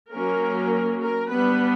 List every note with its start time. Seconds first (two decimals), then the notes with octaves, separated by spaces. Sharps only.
0.11 F#3 A#3 C#4 A#4
1.01 A#4
1.30 G3 B3 D4 B4